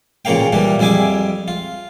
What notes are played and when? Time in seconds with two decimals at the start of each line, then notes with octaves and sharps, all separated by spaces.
0.25 A1 A#2 C#3 A#3 F5 G5
0.52 A#2 E3 G3 D4
0.79 F2 G3 E4 G#4 G#5 D6
1.48 F4